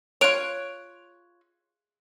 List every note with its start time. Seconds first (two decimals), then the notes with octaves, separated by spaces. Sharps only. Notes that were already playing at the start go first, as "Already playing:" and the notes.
0.21 F4 C#5 F#6 D7 F7